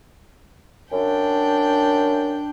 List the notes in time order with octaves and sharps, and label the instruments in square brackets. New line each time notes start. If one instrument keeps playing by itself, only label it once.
[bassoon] F#2 [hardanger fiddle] D4 G5